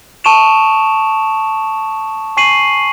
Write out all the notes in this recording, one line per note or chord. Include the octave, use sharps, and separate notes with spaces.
A5 C#6 D#6 D7 E7 F7
G#5 C#6 C7 D#7 F#7